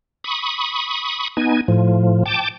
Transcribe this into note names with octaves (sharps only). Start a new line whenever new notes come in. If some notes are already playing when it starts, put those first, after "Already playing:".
B5 C#6 D#6
B3 D#4 G#5
A2 F3
G5 A5 D6